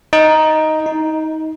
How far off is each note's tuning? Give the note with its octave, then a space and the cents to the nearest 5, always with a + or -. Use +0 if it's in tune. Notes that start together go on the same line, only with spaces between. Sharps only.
D#4 +5
D#4 +25